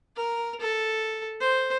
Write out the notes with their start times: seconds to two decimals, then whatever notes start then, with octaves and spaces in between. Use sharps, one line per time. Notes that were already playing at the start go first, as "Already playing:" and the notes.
0.16 A#4
0.61 A4
1.41 C5